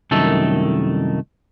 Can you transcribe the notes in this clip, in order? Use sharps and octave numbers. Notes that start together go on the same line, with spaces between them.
C2 F#2 D#3 A3 A4